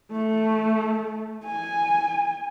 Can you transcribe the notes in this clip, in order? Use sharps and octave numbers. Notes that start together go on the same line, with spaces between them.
A3
G#5